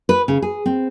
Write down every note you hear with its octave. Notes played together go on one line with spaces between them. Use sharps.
B4
C#3
G#4
C4